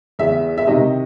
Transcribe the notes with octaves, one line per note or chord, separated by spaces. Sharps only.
E2 E5
E5
C3 D#3 D#5